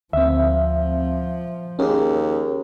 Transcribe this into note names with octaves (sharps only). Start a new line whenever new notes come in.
D2 F3 C4 E5
D#2 C#4 G#4